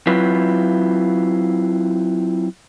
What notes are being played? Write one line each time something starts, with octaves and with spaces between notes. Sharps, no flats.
F#3 C4 E4 F4 B4